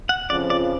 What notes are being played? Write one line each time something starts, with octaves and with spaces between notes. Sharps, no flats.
F#5
F2 C#3 F3 D5
D5